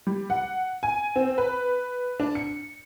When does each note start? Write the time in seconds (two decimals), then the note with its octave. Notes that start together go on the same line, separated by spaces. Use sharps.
0.07 G3
0.30 F#5
0.83 G#5
1.16 C4
1.38 B4
2.20 D4
2.35 C#7